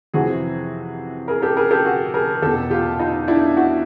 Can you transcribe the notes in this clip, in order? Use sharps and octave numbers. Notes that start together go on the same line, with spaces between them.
F2 C3 E3 F#4 G#4
G#4 A#4
G4 A4
G#4 A#4
G4 A4
F#4 G#4
G#4 A#4
E2 B2 G4 A4
F4 G4
D#4 F4
D4 E4
E4 F#4